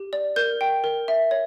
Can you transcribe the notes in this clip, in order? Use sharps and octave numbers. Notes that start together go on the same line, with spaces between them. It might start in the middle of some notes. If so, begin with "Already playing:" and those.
Already playing: G4
D5
A#4 G6
G5
A#4
E5
C#5